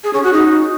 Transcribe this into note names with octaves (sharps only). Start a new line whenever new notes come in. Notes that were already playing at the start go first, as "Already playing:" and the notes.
G#4
C#4
F#4
D#4